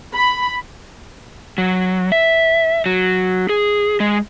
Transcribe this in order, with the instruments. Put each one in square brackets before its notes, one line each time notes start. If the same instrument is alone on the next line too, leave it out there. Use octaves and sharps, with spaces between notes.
[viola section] B5
[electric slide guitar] F#3
E5
F#3
G#4
G#3